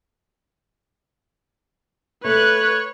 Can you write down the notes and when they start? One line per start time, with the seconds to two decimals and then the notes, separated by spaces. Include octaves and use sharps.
2.24 A3 B4 C#5 F#6